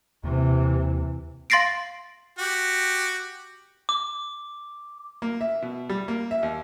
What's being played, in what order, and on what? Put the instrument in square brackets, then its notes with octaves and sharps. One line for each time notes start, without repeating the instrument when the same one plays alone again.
[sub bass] D#2 [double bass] C3 E3
[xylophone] F5 C6 A6 A#6 C7 D7
[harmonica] F#4 G4
[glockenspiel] D6
[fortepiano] A#3
E5
B2
G3
A#3
E5
D#2